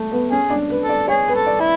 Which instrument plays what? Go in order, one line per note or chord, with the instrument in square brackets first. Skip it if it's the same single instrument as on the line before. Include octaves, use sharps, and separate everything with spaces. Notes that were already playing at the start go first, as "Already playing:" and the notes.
Already playing: [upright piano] A3
B3
[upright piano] C#4 [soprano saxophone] G#4
[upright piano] D4
B4
[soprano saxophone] A4
[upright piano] D5
[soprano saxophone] G#4 [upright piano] C#5
[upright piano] B4
[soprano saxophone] A4
[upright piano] D5
[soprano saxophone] E4